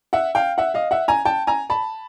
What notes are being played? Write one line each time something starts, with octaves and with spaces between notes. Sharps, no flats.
E5 F#5
F5 G5
E5 F#5
D#5 F5
E5 F#5
G#5 A#5
G5 A5
G#5 A#5
A5 B5